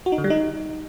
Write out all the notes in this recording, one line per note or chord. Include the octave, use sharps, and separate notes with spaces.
F#4
D#4
D3
G3
D#4